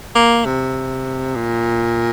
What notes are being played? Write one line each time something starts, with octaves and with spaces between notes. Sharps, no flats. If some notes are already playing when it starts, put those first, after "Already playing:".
A#3
C3
A#2